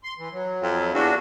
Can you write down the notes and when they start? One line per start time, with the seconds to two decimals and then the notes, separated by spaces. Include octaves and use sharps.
0.04 C6
0.18 E3
0.32 F#3
0.63 F2
0.94 E2 D4 F#4